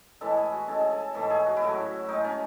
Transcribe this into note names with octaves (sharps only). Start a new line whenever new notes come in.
A2 E3 G#3 A4
G#4
F#4
C#3 G#3 A4
G#4
A4
G#2 E3 A3 A4
G#4
F#4
E4
A2 F#3 A3 F#4
A2 G#3 D#4
C#4